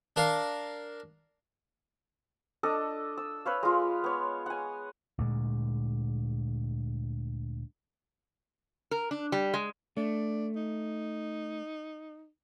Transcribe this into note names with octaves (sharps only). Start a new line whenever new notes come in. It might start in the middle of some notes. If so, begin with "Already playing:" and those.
D4 A#4 F5
D4 A4 D#5
E6
B4 C#5 F5
G#3 F4
B3 C#5
F#5 G#5
D2 A#2 G#3
A#4
D4
G3
G#3
A3 D4
D#4